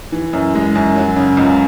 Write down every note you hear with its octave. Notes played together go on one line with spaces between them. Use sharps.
E3
F#2
G#3
F#2
F#3
C#3
C#2